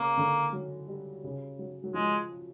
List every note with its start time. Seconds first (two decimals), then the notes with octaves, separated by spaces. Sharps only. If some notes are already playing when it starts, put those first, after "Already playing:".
Already playing: C#3 A#3
0.17 D3
0.53 F#3
0.88 G3
1.24 C#3
1.59 F#3
1.84 F#3
1.94 F3 G#3